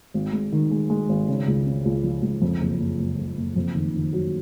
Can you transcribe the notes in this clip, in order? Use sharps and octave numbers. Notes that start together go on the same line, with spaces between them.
G#1
G#3
D#3
G#3
G#3
G#1
C#3
C#2
C#3
C#2
F3
C#2
F2
F#1
F#1
F#1
F#1
F#1
F2
D#3
D#3
F#3